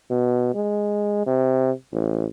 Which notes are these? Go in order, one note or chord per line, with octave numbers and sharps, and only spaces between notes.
B2
G#3
C3
A1